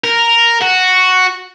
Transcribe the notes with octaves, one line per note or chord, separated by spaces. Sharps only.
A#4
F#4